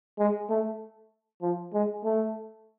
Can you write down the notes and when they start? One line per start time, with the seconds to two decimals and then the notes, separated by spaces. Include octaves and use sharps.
0.19 G#3
0.50 A3
1.42 F3
1.74 G#3
2.04 A3